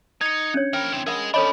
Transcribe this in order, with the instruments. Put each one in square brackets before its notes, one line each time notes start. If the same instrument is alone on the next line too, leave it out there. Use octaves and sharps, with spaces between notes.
[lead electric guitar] D#4 [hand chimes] G#6 C#7
[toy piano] C#4 D4 C#5
[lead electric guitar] F3 A#4 [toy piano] G5 B5
[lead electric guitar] E3 C4
[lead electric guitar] G#4 D#5 [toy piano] A#4 F#5 B5
[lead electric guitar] C#4 D4 [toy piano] A4 C#5 D#5 [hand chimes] B5